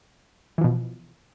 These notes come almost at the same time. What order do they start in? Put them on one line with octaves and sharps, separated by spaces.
E3 F3 B2